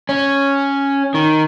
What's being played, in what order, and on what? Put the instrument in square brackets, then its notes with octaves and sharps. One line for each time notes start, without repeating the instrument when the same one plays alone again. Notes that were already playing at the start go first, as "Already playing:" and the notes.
[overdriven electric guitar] C#4
D#3